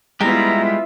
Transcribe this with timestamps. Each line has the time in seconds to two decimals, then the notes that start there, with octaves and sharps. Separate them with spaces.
0.20 G3 G#3 B3 E4 F4 G4 E5 A#5